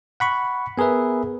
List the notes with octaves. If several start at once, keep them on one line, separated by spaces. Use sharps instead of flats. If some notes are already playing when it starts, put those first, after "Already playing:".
F#5 B5 C#6
B3 G#4 A#4 B4 E5